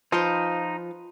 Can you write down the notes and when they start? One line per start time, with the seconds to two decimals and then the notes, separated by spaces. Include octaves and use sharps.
0.12 F3 D#4 F4 B4 C5 F5